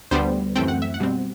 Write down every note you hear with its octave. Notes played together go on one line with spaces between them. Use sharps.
D2 D3 G3 B3 C5
F#2 E3 A3 C4 G5
F#5
E5
F#5
B2 G3 C4